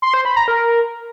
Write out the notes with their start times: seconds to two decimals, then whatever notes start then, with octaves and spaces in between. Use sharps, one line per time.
0.02 C6
0.14 C5
0.25 B5
0.36 A#5
0.48 A#4